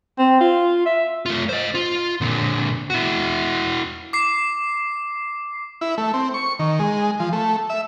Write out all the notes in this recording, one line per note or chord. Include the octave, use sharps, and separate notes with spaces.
C4
F4
E5
A3 F4
C5 D#5
F4
A#2 D3
E4 F#4
D6 C7
E4
A3
C4
C#6
D#3
G#3
F3
A3
E5